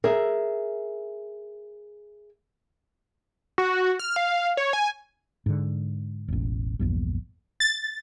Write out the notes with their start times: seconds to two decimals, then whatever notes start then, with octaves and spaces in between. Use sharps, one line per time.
0.04 G#4 A#4 E5
3.58 F#4
4.00 F6
4.16 F5
4.57 C#5
4.73 G#5
5.46 G#2 D3
6.28 E1 A1
6.79 A#1 E2 G2
7.60 A6